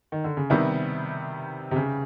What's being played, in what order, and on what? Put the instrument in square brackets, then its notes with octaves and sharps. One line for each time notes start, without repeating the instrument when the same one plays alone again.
[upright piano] D#3
D3
C#3
[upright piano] C3 [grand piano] D#3 G3 B3 E4
[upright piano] C3
C#3